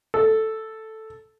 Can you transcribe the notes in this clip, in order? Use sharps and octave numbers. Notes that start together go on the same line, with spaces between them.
A4